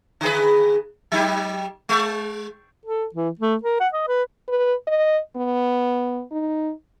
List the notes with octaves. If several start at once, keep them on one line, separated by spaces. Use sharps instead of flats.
D3 G#4 B4
F#3 D#4 G4
G#3
A4
E3
A3
A#4
F#5
D#5
B4
B4
D#5
B3
D#4